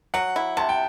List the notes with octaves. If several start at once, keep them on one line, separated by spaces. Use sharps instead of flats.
F#3 F#5
E4
C3 A5
G5